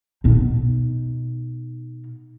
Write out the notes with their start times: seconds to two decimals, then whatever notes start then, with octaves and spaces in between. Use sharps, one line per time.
0.24 B2 D#4